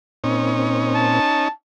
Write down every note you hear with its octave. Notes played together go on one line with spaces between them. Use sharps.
A#2 C4 C#4 D#4
A5